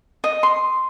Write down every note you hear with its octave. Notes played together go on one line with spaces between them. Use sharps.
D#5
C6